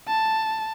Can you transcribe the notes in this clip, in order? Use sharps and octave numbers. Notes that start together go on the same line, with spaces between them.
A5